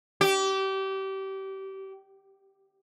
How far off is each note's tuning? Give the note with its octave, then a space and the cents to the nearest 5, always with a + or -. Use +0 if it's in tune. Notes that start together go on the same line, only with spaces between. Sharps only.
G4 -25